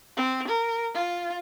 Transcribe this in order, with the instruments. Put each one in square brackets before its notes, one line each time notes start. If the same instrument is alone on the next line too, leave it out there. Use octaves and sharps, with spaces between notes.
[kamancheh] C4
A#4
F4